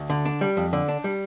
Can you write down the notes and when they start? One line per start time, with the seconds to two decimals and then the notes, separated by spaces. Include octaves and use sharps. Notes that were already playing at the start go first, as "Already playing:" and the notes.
Already playing: D2
0.10 D3
0.25 D4
0.41 G3
0.57 F2
0.73 D3
0.88 D4
1.04 G3